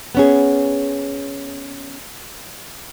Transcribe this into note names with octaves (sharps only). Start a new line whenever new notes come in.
B3 C#4 G#4